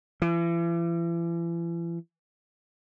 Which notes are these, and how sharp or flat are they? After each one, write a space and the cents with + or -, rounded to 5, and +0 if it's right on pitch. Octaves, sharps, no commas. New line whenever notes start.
E3 +40